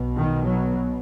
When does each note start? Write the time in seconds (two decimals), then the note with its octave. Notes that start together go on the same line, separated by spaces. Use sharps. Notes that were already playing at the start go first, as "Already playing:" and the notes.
Already playing: B1 B2
0.16 D#3
0.46 F#3